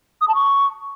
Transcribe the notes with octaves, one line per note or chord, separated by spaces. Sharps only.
D#6
A5
C#6